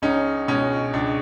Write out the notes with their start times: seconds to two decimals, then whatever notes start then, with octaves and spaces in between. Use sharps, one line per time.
0.02 C#2 C#4 D#4
0.48 B2 G#3 C#4
0.93 C#2 D4